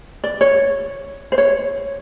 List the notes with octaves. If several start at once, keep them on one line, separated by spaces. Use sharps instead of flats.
D5
C#5
C5
C#5